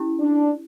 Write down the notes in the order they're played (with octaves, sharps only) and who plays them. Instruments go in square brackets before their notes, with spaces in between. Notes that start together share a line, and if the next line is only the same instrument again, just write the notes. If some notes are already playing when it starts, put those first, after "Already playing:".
Already playing: [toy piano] C#4 E4 G4
[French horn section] D4